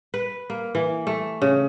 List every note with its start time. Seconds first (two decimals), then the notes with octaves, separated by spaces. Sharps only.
0.14 B4
0.50 A#3
0.75 E3
1.07 A3
1.42 C#3